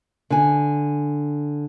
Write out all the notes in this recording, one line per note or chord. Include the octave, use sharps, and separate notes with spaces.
D3 G#5